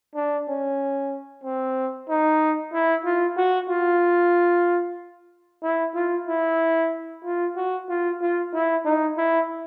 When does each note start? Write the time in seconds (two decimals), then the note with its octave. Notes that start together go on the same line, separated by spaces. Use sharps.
0.15 D4
0.48 C#4
1.44 C4
2.09 D#4
2.73 E4
3.05 F4
3.37 F#4
3.69 F4
5.63 E4
5.95 F4
6.27 E4
7.25 F4
7.56 F#4
7.89 F4
8.22 F4
8.54 E4
8.85 D#4
9.17 E4